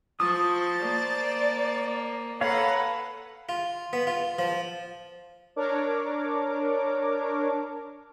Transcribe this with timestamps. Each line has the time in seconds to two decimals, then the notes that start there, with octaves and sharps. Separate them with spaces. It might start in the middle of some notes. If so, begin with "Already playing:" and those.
0.20 F3 C5 A5 C#6 D#6
0.82 A#3 D5
2.41 A4 B4 C#5 F5 F#5 A#5
3.49 F4
3.93 B3
4.07 F4
4.39 F3
5.56 D4 A#4 C#5 D6